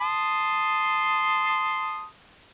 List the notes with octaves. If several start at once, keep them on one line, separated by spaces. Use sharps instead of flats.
A5 C6 D#6